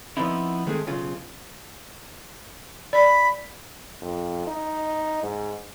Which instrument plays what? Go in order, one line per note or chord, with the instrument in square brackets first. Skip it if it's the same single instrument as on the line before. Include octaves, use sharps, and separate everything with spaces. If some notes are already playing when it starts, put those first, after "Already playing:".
[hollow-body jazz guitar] F3 F#3 B3 C4 D#4 E4
D#3 G#3 A3 C4 G#4
B1 C#3 F4
[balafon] D5 [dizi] B5
[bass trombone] F2
D#4
G#2